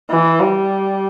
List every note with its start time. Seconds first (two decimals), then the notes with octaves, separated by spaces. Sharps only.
0.10 E3
0.40 G3